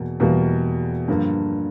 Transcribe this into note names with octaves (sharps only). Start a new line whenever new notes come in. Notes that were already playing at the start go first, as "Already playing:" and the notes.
Already playing: E2 B2 A#3
E2 B2 G3 A#3
G2 D3 F3 A#3